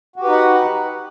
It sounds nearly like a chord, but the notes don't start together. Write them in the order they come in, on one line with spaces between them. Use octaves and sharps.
F#4 G4 B4 D#4 F#5